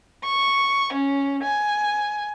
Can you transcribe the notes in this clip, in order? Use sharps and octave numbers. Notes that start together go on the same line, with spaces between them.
C#6
C#4
G#5